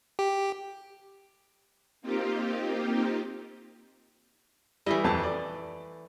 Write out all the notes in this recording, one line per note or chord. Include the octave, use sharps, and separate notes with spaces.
G4
A#3 C4 D#4 F4 G4
E3 G3 A3 E4 D#5
D#1 F2 A5
D5